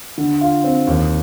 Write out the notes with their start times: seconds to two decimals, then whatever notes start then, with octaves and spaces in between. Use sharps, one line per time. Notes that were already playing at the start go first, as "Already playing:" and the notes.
0.18 D3
0.41 F4
0.64 C4
0.87 D#2